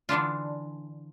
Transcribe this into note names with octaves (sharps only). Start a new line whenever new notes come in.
D3 E3 D4 F4